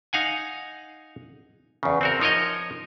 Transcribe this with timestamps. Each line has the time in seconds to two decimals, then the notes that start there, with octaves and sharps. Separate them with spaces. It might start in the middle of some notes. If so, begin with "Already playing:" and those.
0.13 D#4 F5 F#5 G#5
1.83 E2 C#3
2.01 C4 F#4 A#4
2.20 F3 D#4 A#4 C#5 D#5